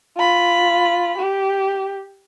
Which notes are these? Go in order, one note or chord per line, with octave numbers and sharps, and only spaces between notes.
F4 B5
G4